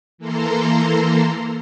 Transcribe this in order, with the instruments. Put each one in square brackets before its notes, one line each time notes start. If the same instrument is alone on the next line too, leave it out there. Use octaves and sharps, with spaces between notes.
[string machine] E3 A#3 A4 A#5 C6